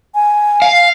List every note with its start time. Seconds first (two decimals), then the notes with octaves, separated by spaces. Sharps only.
0.15 G#5
0.62 F5